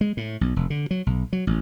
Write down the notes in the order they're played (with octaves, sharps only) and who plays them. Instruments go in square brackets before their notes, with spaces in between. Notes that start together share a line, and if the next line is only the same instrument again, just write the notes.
[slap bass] G#3
A2
B1
F1
D3
F#3
B1
F#3
A1